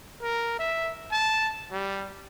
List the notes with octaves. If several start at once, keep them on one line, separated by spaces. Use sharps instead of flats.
A#4
E5
A5
G3